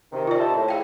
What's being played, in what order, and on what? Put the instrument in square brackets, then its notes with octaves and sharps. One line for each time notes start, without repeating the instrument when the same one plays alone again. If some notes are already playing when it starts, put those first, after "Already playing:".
[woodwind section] C3 D#3
[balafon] F4 D5
[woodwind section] C5 E5 A5
A2
[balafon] G#4 F5 G5